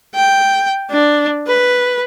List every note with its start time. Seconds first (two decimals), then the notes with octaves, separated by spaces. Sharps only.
0.15 G5
0.91 D4
1.47 B4